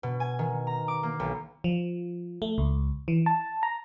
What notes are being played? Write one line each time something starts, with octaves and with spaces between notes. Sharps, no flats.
B2
G#5
D#3
A#5
D6
A#3
B1
F3
A3
C#2
E3
A5
A#5